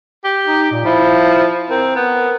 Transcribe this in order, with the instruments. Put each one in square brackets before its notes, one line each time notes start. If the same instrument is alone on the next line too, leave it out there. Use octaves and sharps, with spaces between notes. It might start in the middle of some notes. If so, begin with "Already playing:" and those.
[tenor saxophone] G4
[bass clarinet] D#4
A#2
[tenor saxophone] F3 [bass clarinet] E4
[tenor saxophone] C4 [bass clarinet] A#4
[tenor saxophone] B3